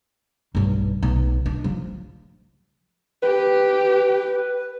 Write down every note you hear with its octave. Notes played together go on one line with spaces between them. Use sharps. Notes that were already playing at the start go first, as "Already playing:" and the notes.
B1 G2
B1
D4
F3
G4 B4